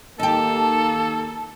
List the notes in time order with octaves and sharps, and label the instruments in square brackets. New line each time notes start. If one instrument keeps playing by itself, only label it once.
[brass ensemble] D#3 A#3 [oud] D#4 G4 [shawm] A4 [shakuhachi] A5